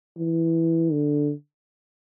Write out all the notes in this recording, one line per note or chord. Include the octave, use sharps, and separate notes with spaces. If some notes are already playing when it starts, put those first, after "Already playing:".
E3
D3